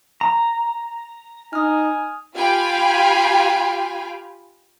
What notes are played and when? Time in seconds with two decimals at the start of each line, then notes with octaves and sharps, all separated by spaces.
0.21 A#5
1.53 D#4 G#5 D#6 F6
2.35 F4 G4 F5 G5 G#5 B5